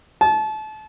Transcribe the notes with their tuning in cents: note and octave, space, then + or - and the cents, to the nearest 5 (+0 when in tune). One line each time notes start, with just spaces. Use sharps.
A5 -30